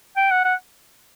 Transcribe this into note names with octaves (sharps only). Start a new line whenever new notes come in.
G5
F#5
F#5